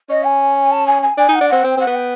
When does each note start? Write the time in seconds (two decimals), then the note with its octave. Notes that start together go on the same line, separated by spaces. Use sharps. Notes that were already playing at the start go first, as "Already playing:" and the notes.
0.09 C#4 D#5
0.24 G#5
0.71 A5
0.86 G#5
1.02 G#5
1.17 D4 G#5
1.29 D#4 F#5
1.41 D4
1.49 C4 F#5
1.63 C4 G5
1.77 C4 F#5
1.87 B3
1.95 G5